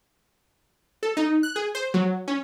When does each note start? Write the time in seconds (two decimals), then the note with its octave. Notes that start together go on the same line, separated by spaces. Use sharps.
1.03 A4
1.17 D#4
1.43 F#6
1.56 G#4
1.75 C5
1.94 F#3
2.28 C#4